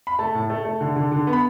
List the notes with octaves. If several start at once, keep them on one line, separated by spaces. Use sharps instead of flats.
B5
A3 A5
A2
A3
A3
D3
D3
D3
B3
B5